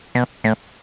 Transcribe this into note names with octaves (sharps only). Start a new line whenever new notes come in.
B2
A2